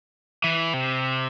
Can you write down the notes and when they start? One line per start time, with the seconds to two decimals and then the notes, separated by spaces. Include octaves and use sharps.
0.44 E3
0.74 C3